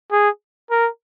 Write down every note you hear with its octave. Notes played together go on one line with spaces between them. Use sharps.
G#4
A#4